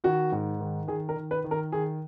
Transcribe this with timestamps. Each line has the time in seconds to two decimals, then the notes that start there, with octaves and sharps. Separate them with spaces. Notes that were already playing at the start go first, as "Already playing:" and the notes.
0.04 D#3 F#4
0.32 G#2
0.60 D#3
0.88 D#3 G#4
1.09 A#4
1.16 D#3
1.31 B4
1.44 D#3
1.51 A#4
1.72 D#3 G#4